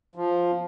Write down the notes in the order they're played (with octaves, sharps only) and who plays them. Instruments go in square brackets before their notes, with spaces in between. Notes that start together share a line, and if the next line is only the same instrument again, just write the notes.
[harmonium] F3